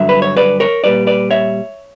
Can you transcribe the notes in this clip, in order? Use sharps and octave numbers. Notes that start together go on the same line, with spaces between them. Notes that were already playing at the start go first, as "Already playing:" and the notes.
Already playing: G2 D3 F#3 E5
B4
C#5
B4 D5
A#4 C#5
A#2 G3 B4 D5
B4 D5
C#5 E5